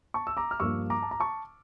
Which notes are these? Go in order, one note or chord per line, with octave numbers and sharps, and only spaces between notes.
A5 C#6
E6
A#5 D6
F6
G2 F3 A#3 D4 C#6 E6
A#5 D6
A5
A#5
A5 C#6